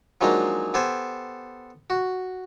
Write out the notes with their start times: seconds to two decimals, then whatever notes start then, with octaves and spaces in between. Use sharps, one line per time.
0.21 F3 F#3 G#3 A#3 D4 D#4
0.74 B3 G4 A4 C5 G#5
1.90 F#4